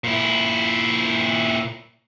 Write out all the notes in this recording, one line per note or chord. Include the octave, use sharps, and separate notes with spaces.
A#2 E4